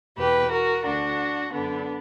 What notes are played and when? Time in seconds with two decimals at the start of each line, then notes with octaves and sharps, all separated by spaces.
0.17 E2 B2 G4 B4
0.51 F#4 A#4
0.85 D2 D3 D4 F#4
1.52 F#2 D3 B3 D4